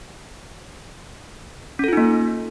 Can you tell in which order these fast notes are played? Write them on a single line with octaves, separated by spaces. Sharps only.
C#4 A4 F4 D#4 A#3